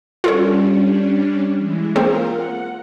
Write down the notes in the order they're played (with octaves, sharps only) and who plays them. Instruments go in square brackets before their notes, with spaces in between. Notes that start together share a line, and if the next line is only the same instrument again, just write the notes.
[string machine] G3 C#4 D4 [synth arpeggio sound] F4 A4 C#5
[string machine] E3 G#3
[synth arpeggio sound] A#3 C4 G#4 [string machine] F4 A#4
[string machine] F#5